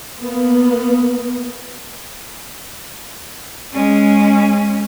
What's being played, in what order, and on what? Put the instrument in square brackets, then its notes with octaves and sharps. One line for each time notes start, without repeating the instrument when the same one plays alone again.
[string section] A#3 B3
[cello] G#3 C#4